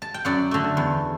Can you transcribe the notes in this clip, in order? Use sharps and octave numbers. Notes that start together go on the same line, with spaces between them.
A5
G5
F#2 D5 F#5
D3 A3
E2